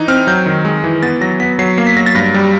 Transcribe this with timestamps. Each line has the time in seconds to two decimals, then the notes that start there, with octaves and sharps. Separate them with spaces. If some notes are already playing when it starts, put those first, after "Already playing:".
Already playing: E3 D#4
0.08 C4 F6
0.27 F#3 G6
0.46 D#3
0.65 G#3
0.84 E3
1.03 B3 A6
1.21 F#3 A#6
1.40 B3 B6
1.59 F#3 C7
1.78 A#3 C7
1.87 B6
1.96 F#3 A#6
2.06 A6
2.15 G2 A#6
2.34 G3